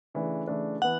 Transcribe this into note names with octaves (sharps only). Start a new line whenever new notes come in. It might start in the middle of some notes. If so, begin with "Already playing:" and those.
C#3 E3 A3 D4
C#3 E3 A3 D4
E3 B3 F#5